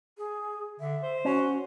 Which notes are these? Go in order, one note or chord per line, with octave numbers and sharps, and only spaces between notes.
G#4
D3 E5
C5
C#4 F#4